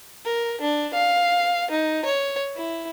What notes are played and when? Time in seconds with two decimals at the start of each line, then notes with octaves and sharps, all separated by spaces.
0.25 A#4
0.61 D4
0.94 F5
1.70 D#4
2.05 C#5
2.56 E4